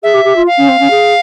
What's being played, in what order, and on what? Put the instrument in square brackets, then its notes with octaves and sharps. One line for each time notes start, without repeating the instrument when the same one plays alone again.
[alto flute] G#4 [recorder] E5
[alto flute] G4
G4
F4
[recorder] F5
[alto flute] C#4
C4
C#4
G#4